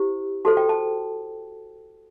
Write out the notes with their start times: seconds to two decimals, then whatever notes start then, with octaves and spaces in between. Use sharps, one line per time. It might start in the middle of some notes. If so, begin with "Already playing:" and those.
Already playing: E4 G4 C5
0.45 F#4 A4 C5 A5
0.57 G5
0.69 A5